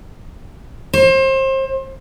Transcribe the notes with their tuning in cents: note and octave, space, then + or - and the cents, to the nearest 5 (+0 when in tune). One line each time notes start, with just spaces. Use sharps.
C5 +30